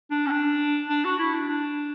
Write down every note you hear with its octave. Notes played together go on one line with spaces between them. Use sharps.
D4
C#4
D4
D4
F#4
E4
D4
D4